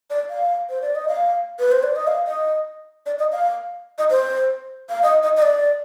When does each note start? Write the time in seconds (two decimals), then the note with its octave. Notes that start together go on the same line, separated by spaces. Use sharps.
0.10 D5
0.30 F5
0.70 C5
0.82 D5
0.95 D#5
1.08 F5
1.59 B4
1.72 C5
1.83 D5
1.96 D#5
2.07 F5
2.27 D#5
3.06 D5
3.19 D#5
3.32 F5
3.98 D#5
4.10 C5
4.90 F5
5.03 D#5
5.23 D#5
5.37 D#5
5.42 D5